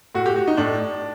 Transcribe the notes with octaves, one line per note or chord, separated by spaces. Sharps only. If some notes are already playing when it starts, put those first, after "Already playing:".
A2 F#4
G4
F#4
D#4
A2 D4